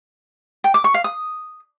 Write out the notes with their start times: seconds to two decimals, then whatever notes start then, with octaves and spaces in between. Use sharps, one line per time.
0.64 G5
0.74 D6
0.84 C#6
0.94 F5
1.04 D#6